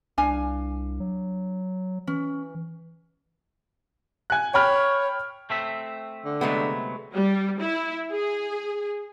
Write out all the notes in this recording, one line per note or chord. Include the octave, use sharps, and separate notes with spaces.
C2 D4 F5 G#5
F#3
E3 C#4
G#5 F#6
C#5 G5 B5 F6
A3 C4 E5
D3
C3 F#3 G#3 A3 B3
G3
E4
G#4